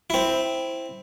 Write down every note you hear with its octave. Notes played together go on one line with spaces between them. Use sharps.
C4 E4